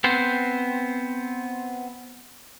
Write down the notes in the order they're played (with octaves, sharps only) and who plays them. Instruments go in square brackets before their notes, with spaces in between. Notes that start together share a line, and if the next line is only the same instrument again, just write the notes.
[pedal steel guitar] B3 C4 C5